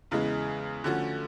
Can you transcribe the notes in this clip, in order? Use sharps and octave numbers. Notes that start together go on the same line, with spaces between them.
E2 C#3 E3 G#3
D3 F3 A3 C#4 F#4